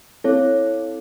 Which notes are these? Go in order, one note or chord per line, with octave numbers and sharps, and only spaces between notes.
C4 E4 A4 C#5